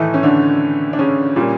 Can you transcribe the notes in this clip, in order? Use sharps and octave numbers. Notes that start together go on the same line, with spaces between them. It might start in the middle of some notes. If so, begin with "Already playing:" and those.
Already playing: A2 D#3 E3 A3 D#4
C#4
D3 D4
D4
C#3 C#4
A#2 G3 A#3